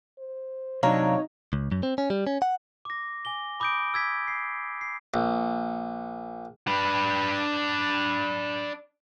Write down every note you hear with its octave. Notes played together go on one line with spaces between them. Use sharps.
C5
C3 F#3 D4 D#4 C#5 F5 A#5
C#2
F#2
C4
C#4
G3
C#4
F#5
D6 A#6
G#5 D6 G7
B5 D6 D#6 G6 A#6 D7
E6 G#6 B6
C7
C7
A#1
D4 B4